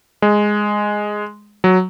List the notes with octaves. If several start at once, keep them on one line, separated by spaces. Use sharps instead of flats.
G#3
F#3